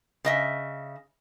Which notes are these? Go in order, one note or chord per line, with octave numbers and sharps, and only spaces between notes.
C#3 D#5 E5